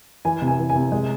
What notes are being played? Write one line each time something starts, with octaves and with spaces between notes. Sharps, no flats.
E3 G#5
C3
G#5
E3
G#5
C3
G#3